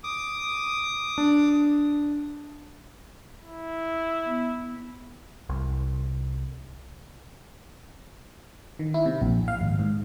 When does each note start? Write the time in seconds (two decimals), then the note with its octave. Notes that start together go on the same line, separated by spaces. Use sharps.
0.04 D6 D#6
1.18 D4
3.43 E4
4.26 B3
5.49 C2
8.79 D#3
8.94 E4
9.06 C3
9.21 A#1
9.48 F5
9.61 G#1
9.79 G#2